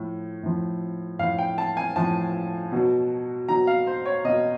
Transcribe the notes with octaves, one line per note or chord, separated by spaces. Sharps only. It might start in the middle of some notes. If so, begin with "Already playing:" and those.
Already playing: A2 F3
A2 F3
A2 F3 F5
G5
A5
G#5
A2 F3 A5
B2 F#3
B2 F#3 A#5
F5
C5
C#5
B2 F#3 D#5